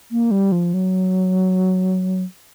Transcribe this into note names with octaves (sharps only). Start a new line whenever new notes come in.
A#3
G3
F3
F#3